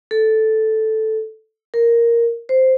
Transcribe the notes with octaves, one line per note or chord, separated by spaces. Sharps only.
A4
A#4
C5